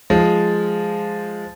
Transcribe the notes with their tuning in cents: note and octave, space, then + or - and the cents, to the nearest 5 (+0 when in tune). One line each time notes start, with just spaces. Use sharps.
F3 +0 G#3 +0